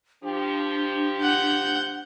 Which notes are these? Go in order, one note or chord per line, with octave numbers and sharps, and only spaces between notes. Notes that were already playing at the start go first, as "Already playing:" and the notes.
F3 D4 G4
F#5 G6